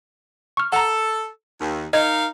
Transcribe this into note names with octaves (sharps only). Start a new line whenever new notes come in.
C#6 F6
A4 F#5 A#5
D#2
D#4 A#4 D#5 F5 G#6